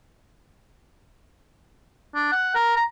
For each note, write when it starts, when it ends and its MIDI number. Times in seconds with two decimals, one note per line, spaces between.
2.15 2.28 62
2.32 2.53 78
2.55 2.75 70
2.76 2.84 82